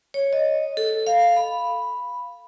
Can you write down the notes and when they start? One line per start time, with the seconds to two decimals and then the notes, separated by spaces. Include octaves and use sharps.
0.14 C#5
0.33 D#5
0.77 A4
1.07 F5
1.36 B5